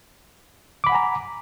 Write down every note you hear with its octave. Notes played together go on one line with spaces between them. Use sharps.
F#5 G#5 A#5 B5 D6